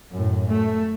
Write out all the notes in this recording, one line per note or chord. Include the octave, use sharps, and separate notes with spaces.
F#2 A2
A3